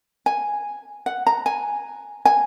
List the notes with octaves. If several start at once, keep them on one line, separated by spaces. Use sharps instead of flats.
G#5
F#5
A#5
G#5
G#5